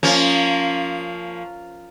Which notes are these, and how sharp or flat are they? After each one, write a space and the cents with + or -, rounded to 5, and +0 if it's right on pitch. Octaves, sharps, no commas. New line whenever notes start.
F3 +0 A#3 -20 C#4 +10